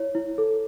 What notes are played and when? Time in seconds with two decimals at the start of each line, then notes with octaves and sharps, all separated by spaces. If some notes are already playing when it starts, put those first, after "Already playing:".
Already playing: E4 C#5
0.15 E4
0.38 A4